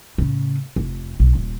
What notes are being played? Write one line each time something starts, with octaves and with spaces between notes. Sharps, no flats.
A2 C#3
F1
B1
D#1